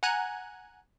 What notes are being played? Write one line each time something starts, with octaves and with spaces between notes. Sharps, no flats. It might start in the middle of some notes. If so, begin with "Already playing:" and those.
F#5 G#5 A#5 F#6 G#6